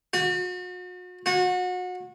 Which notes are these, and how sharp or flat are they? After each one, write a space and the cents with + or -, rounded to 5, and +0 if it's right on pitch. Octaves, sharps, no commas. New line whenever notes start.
F#4 -40
F#4 -30